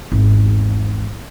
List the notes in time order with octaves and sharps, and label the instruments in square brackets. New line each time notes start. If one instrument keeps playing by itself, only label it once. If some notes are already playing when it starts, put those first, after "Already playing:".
[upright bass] G#1 E2